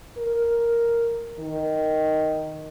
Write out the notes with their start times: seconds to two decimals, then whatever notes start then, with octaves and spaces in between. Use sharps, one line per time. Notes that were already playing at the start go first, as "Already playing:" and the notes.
0.18 A#4
1.39 D#3